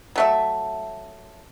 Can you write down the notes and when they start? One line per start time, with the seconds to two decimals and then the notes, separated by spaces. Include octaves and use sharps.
0.16 F#3 A3 E5